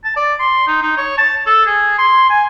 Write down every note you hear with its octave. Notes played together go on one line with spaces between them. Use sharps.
A5
D5
C6
D#4
D#4
C#5
A5
A4
G#4
C6
G#5